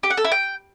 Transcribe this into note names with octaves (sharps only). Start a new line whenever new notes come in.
G4
F#5
A4
E4
G5